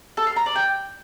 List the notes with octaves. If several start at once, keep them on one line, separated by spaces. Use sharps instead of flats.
A4
F5
A#5
D5
G5